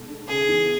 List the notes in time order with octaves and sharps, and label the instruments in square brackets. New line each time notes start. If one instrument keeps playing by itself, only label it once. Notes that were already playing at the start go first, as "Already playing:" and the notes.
Already playing: [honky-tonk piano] B2 G#3 A4
D4
[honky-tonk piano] C#3 [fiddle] G#4
[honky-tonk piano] E2